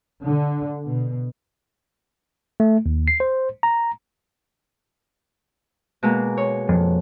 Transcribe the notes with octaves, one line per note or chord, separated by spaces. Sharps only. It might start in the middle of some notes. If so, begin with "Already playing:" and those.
D3
B2
A3
D#2
C7
C5
A#5
B2 G#3 A#3
C#5
F2